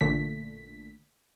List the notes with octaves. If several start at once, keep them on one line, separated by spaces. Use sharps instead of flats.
A1 A#2 D3 A3 B6